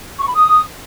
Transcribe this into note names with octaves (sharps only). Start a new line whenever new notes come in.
C#6
B5
D#6